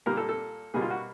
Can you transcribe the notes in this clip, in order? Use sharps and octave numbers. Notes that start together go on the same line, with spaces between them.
A#2 G3 A#3 A#4
A4
A4
B2 G3 A#3 G#4
F4
F#4